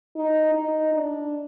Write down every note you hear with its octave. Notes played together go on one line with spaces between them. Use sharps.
D#4
D#4
D4